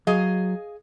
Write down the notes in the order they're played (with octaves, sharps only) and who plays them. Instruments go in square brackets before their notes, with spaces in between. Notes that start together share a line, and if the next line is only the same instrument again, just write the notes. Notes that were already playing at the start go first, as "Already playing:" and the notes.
[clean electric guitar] F#3 [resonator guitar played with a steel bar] G#4 D#5 F5